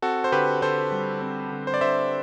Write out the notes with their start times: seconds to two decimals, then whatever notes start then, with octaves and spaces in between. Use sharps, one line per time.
0.02 C4 F#4 A4
0.24 C5
0.32 D3 G4 B4
0.62 D3 A4 C5
0.92 G3
1.22 C4
1.51 D3
1.67 C5
1.74 D5
1.81 D3 C5 E5